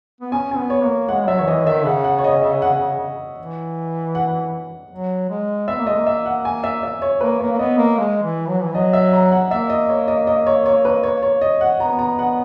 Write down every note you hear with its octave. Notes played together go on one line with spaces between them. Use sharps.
B3
C#4 G#5
G#5
B3
C#5
A#3
G#3 F#5
F#3 E5
D#3 C#5
E3 D#5
D#3 E5
C#3 F#5
F#5
C#5
D#5
E5
F#5
E3
F#5
F#3
G#3
B3 E5
A#3
G#3 D#5
A#3
E5
F#5
G#5
E5
E5
C#5
A#3 B4
A#3 C#5
A#3
B3 D#5
A#3
G#3
E3
F#3
E3
F#3 D#5
E5
A#5
F#5
A#3 E5
D#5
C#5
D#5
D#5
C#5
C#5
B4
C#5
C#5
D#5
F#5
B3 A#5
A#5
F#5